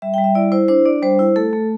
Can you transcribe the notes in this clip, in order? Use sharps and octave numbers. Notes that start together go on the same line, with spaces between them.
G3 E5
G3 G5
E5
E4 D5
E4 C5
D4 C5
D4 D5
G3 C5
E4
A3 A4
A3